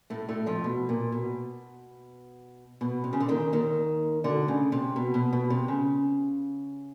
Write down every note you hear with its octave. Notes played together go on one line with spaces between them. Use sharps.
A2 A3
A2 A3
F2 F3
B2
A#2
B2
B2
C3
C#3
D3
D#2 D#3
D#2 D#3
D2 D3
C#3
C3
B2
B2
B2
C3
C#3